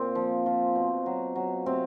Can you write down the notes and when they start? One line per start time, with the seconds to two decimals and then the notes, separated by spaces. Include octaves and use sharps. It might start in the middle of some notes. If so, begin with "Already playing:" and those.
Already playing: A#2 C4
0.15 F3
0.46 F3
0.75 B2
1.06 F#3
1.36 F#3
1.66 C3 C4